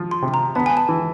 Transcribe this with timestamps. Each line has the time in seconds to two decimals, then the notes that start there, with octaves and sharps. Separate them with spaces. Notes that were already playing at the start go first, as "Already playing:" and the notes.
Already playing: F3
0.11 C6
0.22 C3
0.34 A#5
0.55 B3 A5
0.66 G#5
0.77 A5
0.89 E3